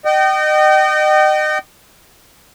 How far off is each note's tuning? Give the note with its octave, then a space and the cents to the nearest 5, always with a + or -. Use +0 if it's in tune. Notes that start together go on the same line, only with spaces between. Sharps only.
D#5 -30 G5 -35